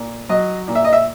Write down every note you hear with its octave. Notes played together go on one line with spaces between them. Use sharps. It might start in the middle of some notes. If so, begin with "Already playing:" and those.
Already playing: A#2
F#3 D#5
A#2
E5
D#5
E5